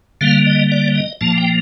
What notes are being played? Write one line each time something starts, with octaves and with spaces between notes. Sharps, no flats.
D3 G3 A#3 F5
D#5
D5
D#5
A#2 F3 A#3 A5
G5